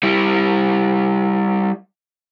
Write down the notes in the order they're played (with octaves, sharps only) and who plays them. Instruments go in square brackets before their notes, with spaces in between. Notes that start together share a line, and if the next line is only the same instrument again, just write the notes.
[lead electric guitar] G3 E4